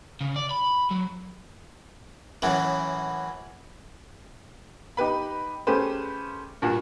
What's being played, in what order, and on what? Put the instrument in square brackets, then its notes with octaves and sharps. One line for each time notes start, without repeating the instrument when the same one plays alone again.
[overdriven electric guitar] C#3
D5
B5
F#3
[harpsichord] F#2 A2 E3 F#3
[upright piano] D#4 G4 B4 B5
A3 C#4 G4 G#4 B4 C5
G2 A#2 F#4